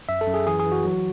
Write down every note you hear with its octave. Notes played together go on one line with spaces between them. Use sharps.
F#2 E5
A4
F#2
G#4
E3 G#4
G#4
E3
F#4
F#3